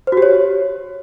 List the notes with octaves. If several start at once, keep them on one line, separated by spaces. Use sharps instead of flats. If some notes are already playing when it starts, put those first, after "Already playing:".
C5
F#4
G4
C#5